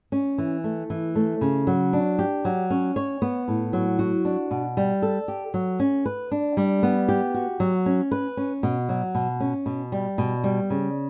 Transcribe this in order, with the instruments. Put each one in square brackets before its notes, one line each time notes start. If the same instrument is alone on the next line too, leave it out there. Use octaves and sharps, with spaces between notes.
[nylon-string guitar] C#4
E3
A3
E3
A3
C#3
F#3
D4
G4
F#3
C#4
C#5
B3
A2
F#3
F#4
D4
B2
G3
A4
G4
F#3
C#4
B4
D4
G3
B3
G4
F#4
F#3
C#4
B4
C#4
B2
F#3
B2
C#4
B2
G3
B2
G3
C#3